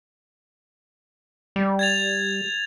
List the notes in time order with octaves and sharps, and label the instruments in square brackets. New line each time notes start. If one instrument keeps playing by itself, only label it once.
[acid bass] G3
[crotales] G#6 A6 F7